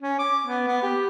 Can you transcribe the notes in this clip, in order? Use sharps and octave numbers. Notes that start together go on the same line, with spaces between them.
C#4
D6
B3
B3
G4